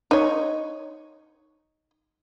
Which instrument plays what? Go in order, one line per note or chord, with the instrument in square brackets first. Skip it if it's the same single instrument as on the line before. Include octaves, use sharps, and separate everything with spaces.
[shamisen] D#4 C#5